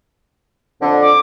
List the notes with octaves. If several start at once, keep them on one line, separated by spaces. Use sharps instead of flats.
F2 D3
D6